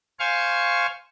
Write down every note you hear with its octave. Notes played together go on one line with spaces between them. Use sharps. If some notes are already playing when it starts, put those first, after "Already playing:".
C5 F5 G#5 C#6